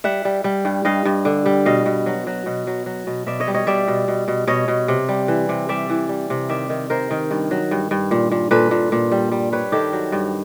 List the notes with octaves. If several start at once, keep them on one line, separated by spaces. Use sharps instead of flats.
G3 E5 F#5
G3
G3
G2
G2 D#5 F5
G2
D3
G3
B2 D#5 F5
B2
F#3
F#3
B2
F#3
F#3
B2
B2 D5 E5
C#5 D#5
G3
C#5 D#5
G3 D5 E5
B2
B2
B2
B2 C#5 D#5
B2
C3
G3
E3
C3
G3 D5 E5
E3
G3
C3
D#3 D5 E5
D#3
D#3 A#4 C5
D#3
G2
F#3
G2
G2
A#2
A#2
A#2 A4 B4
A#2
A#2
G3
G3
G3 B4 C#5
D#3 G4 A4
F#3
G2